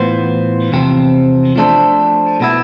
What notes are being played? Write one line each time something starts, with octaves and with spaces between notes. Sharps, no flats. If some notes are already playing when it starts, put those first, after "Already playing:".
Already playing: A2 E3 B3 F4 C5
E2 C3 F3 C4
F3 A3 D4 A4 C5
B2 B3 E4